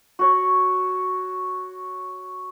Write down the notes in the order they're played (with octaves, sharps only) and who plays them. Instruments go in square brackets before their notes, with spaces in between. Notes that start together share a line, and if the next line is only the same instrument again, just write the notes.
[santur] F#4 C#5